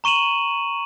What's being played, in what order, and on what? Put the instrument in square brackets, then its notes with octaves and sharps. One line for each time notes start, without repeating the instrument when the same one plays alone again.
[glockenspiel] A#5 C#6 D#7 E7 F#7